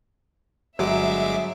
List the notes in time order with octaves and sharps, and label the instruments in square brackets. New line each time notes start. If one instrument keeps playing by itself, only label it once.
[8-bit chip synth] G1 G#3 D6 [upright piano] F#3 [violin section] E5